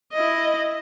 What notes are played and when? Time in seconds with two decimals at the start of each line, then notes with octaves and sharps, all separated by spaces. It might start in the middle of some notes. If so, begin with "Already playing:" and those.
0.13 E4 D#5